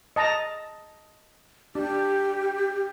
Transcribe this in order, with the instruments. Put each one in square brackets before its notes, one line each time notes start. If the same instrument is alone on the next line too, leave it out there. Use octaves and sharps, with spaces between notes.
[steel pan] D#5 A5 A#5
[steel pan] D4 [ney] G4